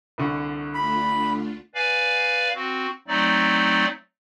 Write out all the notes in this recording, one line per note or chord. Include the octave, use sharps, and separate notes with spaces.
C2 D3 C#6
A3 D4 F4 B5
B4 D5 F5 G#5
C4 F#4
F#3 A3 C4 D#4 D5